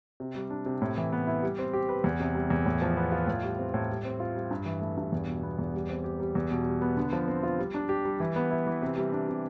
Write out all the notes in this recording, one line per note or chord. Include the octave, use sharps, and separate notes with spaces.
C3
G3
D4
C3
A2
E3
B3
E4
G3
C4
G4
B4
E2
C3
G3
E2
A2
F3
B3
F4
A2
G3
C4
A2
G3
C4
F4
G3
G2
E3
A3
G2
E2
B2
B3
E2
G3
C4
G4
G3
E2
B2
G3
B3
D3
F3
C4
F4
G3
D4
G4
G3
E3
B3
E4
E3
C3
G3
D4
C3